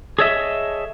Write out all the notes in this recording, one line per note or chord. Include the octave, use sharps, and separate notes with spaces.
G#4 A4 C#5 D#5 E5